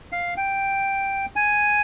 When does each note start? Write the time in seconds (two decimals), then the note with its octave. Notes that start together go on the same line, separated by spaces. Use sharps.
0.12 F5
0.37 G5
1.36 G#5